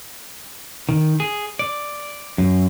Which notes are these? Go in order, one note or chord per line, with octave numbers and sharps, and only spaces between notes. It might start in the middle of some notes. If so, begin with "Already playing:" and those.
D#3
G#4
D5
F#2